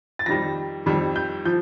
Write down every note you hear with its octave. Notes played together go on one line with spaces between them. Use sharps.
A6
F2 D#3 G3 A#6
F2 D#3 G3
G6
F3 G6